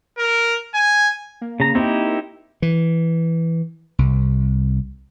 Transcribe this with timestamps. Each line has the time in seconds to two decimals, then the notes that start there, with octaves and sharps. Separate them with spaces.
0.18 A#4
0.74 G#5
1.41 A#3
1.60 C#3 A#5
1.75 C4 D#4 E4 G4
2.62 E3
3.99 C2